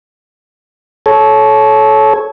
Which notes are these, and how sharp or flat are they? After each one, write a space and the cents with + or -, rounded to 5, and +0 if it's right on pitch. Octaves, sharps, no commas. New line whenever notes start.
A4 -25 C#5 +0